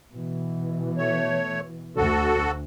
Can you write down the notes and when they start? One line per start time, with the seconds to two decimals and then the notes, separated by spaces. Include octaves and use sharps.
0.13 B2 E3
0.97 A3 C#5
1.96 D2 F#4 A4